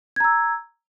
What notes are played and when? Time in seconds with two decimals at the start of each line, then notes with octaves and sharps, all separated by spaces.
0.16 G#6
0.20 A#5
0.24 E6